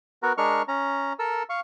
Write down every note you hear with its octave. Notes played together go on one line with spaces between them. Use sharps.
B3 F#4 A#4
G#3 D4 A#4 C#6 F6
C#4 A#5
A4 A#4 E6
F5 C#6